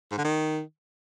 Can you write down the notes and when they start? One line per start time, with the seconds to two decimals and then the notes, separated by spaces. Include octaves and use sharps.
0.11 G#2
0.18 D3
0.25 D#3